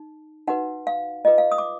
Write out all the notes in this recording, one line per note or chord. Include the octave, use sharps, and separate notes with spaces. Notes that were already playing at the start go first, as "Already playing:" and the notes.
Already playing: D#4
D#4 F#4 B4 F#5
F5
F4 G#4 B4 D#5
F5
D#6
D6